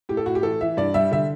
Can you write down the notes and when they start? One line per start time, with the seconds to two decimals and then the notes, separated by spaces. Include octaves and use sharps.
0.09 A2 G4
0.17 A4
0.26 A2 F#4
0.35 G4
0.43 E3 A4
0.61 E3 E5
0.77 G2 D5
0.94 G3 E5
1.11 D3 E5